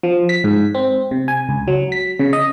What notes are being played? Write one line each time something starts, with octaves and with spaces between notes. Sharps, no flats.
F3
B6
G#2
C4
C3
G#5
C#2
F#3
B6
C#3
D#5